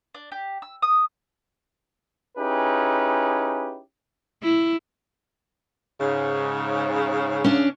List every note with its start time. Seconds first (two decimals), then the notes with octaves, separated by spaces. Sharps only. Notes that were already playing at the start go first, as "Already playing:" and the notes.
0.15 D4
0.32 G4
0.62 E6
0.82 D#6
2.38 C#4 D#4 E4 G4 G#4 B4
4.43 E4
6.00 G#2 C#3
7.44 C#4 D4